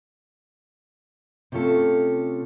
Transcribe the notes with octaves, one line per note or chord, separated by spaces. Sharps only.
C3 A3 C#4 F4 A4